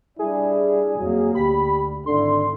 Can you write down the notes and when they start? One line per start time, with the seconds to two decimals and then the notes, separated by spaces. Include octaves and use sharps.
0.19 G3 D4 E4 G#4
0.99 F2 F#3 A#3
1.35 D2 G4 B5
2.06 G#1 D3 E4 C6